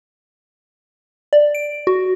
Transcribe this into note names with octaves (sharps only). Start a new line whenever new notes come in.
D5
D7
F#4